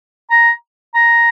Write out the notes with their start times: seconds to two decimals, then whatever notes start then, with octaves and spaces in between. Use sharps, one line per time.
0.31 A#5
0.95 A#5